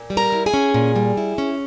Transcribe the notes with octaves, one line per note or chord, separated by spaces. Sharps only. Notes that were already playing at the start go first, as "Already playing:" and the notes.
Already playing: A#2
G3
A#4 A#5
E4
G#4 G#5
C#4
A#2
G3
E4
C#4